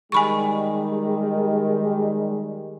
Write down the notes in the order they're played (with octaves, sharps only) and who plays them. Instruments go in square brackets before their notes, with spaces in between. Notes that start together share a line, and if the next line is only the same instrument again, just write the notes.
[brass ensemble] D#3 G3 [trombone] G#3 [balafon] G#5 B5 C#6